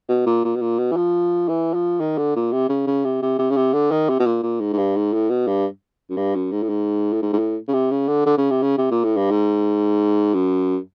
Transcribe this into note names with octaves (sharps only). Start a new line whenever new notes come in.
B2
A#2
A#2
B2
A#2
B2
E3
F3
E3
F3
D#3
D3
A#2
C3
C#3
C#3
C3
C3
C3
C#3
C3
D3
D#3
C3
B2
A#2
A#2
G#2
G#2
G2
G#2
A2
B2
G2
F#2
G2
F#2
G#2
A2
G#2
A2
G#2
G#2
A2
C#3
C3
C#3
D3
D3
C#3
C3
C#3
C3
A#2
A2
G2
G#2
F#2